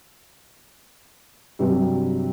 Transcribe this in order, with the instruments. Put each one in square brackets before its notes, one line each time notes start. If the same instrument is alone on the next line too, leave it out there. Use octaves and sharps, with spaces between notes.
[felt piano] G2 C3 F#3